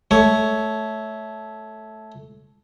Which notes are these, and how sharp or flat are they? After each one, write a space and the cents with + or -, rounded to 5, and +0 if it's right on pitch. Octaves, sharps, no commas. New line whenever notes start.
A3 -10 C#5 +5